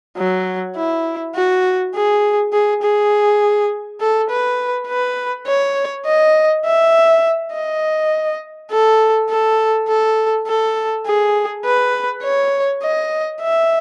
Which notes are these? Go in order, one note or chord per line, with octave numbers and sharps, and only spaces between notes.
F#3
E4
F#4
G#4
G#4
G#4
A4
B4
B4
C#5
D#5
E5
D#5
A4
A4
A4
A4
G#4
B4
C#5
D#5
E5